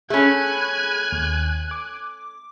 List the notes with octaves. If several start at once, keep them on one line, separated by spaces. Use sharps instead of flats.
A3 C#4 G#4 G#5 B5 F#6
D#2
D6